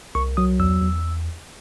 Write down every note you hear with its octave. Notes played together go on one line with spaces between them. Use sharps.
C2 C#6
F#3 D#6
E2 E6
E2